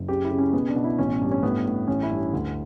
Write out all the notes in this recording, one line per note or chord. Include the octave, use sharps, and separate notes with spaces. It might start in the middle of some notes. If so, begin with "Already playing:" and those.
Already playing: F#1
C#3 G4
E4
C#3
C#4
B2 B3
D4
B2
E4
A1 C#4
G2
C#4
A2 B3
A2
A1 C#4
E4
G2
D2